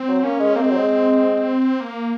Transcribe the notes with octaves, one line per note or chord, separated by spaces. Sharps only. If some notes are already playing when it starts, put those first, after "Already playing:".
Already playing: C4
F#3
A#3 C#4
G#3
A#3 C4
G#3
F#3
G#3
A#3